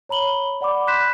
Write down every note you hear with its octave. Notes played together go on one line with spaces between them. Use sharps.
C#5 A#5 B5 F#7 G7
D5 F#5 B5 D6
B5 C6 F#6 G6 B6 E7